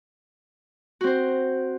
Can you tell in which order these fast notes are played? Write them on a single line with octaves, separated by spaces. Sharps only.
F#4 C4 C5